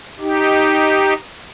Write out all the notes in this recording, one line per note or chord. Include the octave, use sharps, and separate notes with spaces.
D#4 G4